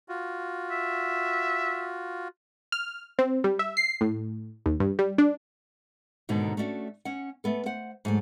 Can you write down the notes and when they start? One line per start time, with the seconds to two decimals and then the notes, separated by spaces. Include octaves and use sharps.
0.09 F4 F#4
0.71 E5
2.72 F6
3.19 C4
3.44 G3
3.59 E5
3.77 C7
4.01 A2
4.66 D#2
4.80 G2
4.99 G3
5.18 D4
6.29 D#2 G#2 B2 D3
6.57 A3 C#4 D4 F#4
7.05 C#4 F#5
7.44 A3 B3 A4
7.66 C5 F#5
8.05 G#2 F#3 A3